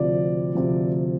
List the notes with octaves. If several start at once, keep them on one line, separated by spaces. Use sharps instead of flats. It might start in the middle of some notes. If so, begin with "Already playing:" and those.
Already playing: D2 C3 F3 D5
D2 C3 F3